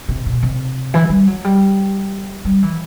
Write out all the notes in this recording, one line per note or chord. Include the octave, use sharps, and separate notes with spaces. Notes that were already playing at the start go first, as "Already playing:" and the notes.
C3
B2
C3
E3
G3
F#3
G3
G3
E3